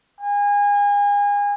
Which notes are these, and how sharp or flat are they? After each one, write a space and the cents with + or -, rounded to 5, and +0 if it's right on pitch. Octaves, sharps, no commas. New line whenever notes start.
G#5 -30